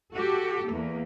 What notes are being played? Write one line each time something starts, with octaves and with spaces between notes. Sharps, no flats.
F#4 G4 A4
E2 A#3